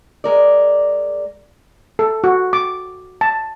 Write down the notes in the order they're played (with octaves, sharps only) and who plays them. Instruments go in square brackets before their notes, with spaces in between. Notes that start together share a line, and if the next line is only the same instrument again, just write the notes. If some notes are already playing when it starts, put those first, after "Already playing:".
[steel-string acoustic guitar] G#3 A#4 D5
[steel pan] A4
F#4
D6
A5